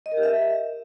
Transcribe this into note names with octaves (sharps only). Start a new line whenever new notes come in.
D#5
A#4
G4
E5